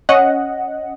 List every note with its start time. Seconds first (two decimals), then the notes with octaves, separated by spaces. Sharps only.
0.09 C#4 D#5 F#5